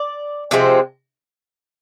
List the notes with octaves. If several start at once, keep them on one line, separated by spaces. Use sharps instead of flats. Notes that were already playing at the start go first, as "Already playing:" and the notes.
Already playing: D5
C3 F3 G#3 C4